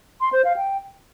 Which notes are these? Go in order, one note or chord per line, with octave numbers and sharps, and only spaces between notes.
C6
C5
F5
G5